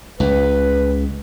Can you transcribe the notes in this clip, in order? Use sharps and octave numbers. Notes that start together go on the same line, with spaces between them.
C#2 B4